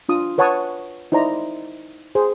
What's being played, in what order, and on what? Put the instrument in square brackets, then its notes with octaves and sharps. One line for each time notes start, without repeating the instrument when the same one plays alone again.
[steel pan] D4 F4 D#6
B4 C#5 F#5 A5 C#6 D#6
D#4 E4 C5 D5 A#5
G#4 C5